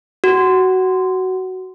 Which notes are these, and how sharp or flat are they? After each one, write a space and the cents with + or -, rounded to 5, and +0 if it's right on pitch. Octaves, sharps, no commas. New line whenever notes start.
F#4 +15